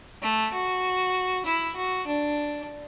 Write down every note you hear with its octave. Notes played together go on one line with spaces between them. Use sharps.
A3
F#4
E4
F#4
D4